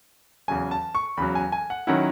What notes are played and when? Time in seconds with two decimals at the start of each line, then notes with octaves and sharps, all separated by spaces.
0.48 E2 C#3 F#3 G#5
0.71 A5
0.95 C#6
1.17 E2 C#3 F#3 B5
1.35 G#5
1.52 G#5
1.70 F#5
1.87 D#3 F#3 C#4 E4 F#5